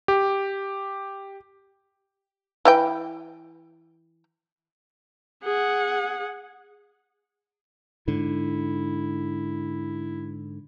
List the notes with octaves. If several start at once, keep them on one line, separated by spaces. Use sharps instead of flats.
G4
E3 B4 G5
G#4 F#5
G#2 D3 E4